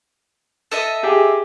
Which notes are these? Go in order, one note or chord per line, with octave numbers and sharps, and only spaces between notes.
A4 D#5 E5
G4 G#4